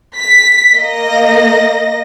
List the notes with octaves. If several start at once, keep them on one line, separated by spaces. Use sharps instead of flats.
B6
A#3 D#5 A#6